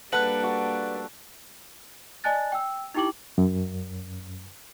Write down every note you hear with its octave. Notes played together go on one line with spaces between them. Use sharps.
G3 A#3 D4 A4 B4 F#5 F#6
F#4
D5 D#5 G#5 A5 F#6 A6
G5 E6
D#4 E4 G4 G5 D6 F#7
F#2